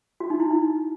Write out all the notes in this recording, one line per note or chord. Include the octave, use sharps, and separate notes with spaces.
F#4
D#4
E4
D#4